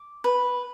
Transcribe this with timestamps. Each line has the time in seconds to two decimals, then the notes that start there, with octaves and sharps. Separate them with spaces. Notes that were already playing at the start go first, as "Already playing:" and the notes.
Already playing: D6
0.24 B4